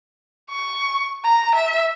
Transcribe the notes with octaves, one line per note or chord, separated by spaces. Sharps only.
C#6
A#5
E5